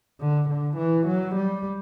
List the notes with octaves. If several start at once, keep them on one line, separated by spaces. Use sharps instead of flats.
D3
D3
E3
F#3
G3